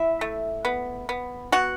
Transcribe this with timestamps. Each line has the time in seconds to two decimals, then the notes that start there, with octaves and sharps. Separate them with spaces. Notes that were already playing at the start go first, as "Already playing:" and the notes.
Already playing: E4 E5
0.21 A3
0.65 B3
1.09 B3
1.52 B3 F#4 F#5